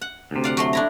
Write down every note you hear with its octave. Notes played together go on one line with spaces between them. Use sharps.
F#5
D2 C3
D5 F5 F#5
F#3 A3 C6
D4 E4 A#5